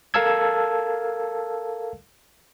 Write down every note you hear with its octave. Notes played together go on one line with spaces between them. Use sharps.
A4 A#4 F5 A5 E6 G#6